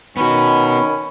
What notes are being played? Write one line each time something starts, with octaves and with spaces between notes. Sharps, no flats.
D#3 B3 C#4 F#4 B5